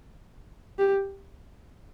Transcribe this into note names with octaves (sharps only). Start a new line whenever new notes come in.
G4